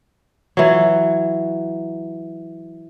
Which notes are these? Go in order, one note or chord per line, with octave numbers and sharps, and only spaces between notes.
E3 F#3